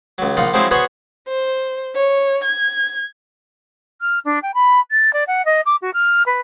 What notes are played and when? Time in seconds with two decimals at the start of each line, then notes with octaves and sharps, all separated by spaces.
0.18 C#2 F#3
0.37 A#1 D#4 F4 F#5
0.54 F3 F#3 G#3 C4 D#4 E4
0.71 B3 F#4 G#4 C5 C#5 F#5
1.27 C5
1.94 C#5
2.44 G#6
4.01 F6
4.25 D4
4.42 G5
4.54 B5
4.91 A6
5.13 D5
5.27 F#5
5.45 D#5
5.65 D6
5.82 F#4
5.94 F6
6.26 B4